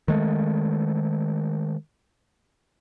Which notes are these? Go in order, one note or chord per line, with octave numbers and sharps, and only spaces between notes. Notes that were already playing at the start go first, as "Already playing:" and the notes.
D#3 G#3 A3